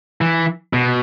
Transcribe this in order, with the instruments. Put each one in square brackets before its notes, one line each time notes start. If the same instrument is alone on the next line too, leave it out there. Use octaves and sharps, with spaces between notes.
[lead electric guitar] E3
B2